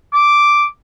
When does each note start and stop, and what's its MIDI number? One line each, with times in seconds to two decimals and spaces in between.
0.13 0.65 86